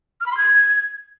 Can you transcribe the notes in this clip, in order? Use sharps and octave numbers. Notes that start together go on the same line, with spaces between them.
F6
B5
C6
G#6